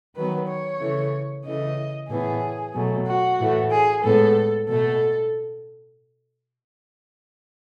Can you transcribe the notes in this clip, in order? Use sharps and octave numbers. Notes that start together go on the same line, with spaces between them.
D#3 F#3 B3 B4
C#5
C#3 E3 A3
C#3 E3 A3 D#5
A2 E3 B3 G#4
B2 F#3 A3
F#4
A2 E3 A3
G#4
A2 G#3 B3 A4
B2 A3 A4